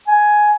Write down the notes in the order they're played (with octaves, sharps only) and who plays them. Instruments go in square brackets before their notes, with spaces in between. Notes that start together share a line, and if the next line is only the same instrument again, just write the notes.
[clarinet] G#5